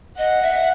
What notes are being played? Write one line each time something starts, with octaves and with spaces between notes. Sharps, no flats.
D#5 F#5
E5